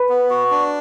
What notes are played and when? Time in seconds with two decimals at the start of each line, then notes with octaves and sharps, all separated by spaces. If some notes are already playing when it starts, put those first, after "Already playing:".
Already playing: B4
0.09 B3
0.30 F#4
0.51 D4